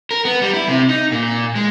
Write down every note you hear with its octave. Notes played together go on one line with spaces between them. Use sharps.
A#4
B3
G3
E4
C3
D#4
A#2
G#3